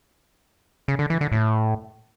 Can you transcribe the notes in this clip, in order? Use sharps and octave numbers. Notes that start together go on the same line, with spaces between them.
C#3
D3
E3
D3
A2